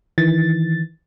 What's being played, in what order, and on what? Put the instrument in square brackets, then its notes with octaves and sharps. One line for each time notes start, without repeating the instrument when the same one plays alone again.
[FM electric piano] D#3 E3 A6